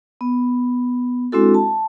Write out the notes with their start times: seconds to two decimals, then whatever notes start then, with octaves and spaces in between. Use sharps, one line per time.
0.21 B3
1.32 G#3 C4 D4 E4 F#4 A4
1.54 A5